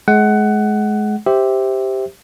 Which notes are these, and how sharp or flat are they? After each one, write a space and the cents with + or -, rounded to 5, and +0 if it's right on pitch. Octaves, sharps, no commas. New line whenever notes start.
G#3 +30 F#5 +15
G4 +0 C5 +0 E5 -10